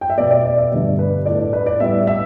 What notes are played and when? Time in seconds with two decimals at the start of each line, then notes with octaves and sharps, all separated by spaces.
0.01 G5
0.10 E5
0.18 B2 B3 D5
0.31 D5
0.45 D5
0.58 E5
0.72 G2 D3 G3 B3 D5
0.99 B4
1.25 A2 A3 D5
1.39 D5
1.53 B4
1.66 D5
1.80 A2 G3 B3 E5
2.07 E5